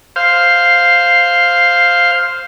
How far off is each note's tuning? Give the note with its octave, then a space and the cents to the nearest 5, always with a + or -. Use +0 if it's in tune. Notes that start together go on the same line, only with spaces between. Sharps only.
C5 +0 F5 +0